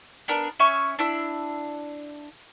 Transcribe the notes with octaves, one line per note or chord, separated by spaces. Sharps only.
B3 D4 A#4
C#4 E5 G#5 C#6
D4 E4 E6